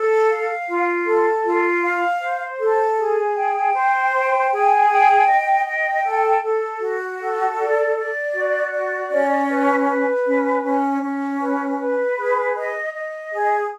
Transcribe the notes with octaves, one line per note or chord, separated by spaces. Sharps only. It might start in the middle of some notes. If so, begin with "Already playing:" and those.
Already playing: A4
F5
F4
A4
F4
F5
C5
A4
G#4
G5
C5
G5
G#4
G5
D#5
G5
A4
A4
F#4
A4
D5
D5
F#4
D5
C#4
B4
B4
C#4
C#4
C#4
B4
B4
G#4
D#5
D#5
G#4